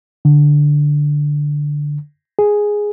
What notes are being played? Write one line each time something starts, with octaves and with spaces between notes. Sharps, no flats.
D3
G#4